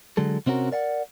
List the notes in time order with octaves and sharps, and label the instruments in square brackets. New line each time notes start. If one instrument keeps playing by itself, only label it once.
[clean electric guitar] D3 F#3 G#3 A4
C3 C4 C#4 F#4 A#4
A#4 D5 F5 F#5